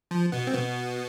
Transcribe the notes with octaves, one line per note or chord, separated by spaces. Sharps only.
F3
B2 B3
C4
B2 B3